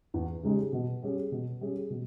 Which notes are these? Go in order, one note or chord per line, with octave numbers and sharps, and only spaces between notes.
E2
C#3 G#3 D#4 G4
B2
G3 C#4 G#4
B2
G3 C#4 G#4
B2